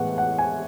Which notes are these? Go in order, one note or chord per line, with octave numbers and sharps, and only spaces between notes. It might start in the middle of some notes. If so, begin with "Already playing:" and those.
Already playing: A2 E3 G#3 B3 F#5
F#5
G#5